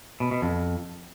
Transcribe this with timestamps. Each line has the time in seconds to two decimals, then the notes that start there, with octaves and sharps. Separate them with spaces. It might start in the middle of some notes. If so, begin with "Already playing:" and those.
0.20 B2
0.31 B2
0.42 F2